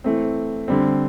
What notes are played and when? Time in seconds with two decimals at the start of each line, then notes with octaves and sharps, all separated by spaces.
0.04 E3 A3 C4
0.68 D3 G3 C4